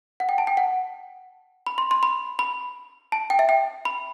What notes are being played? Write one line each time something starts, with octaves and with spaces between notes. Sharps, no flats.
F#5
G5
A5
G5
F#5
B5
C6
C6
B5
B5
A5
G5
E5
G5
B5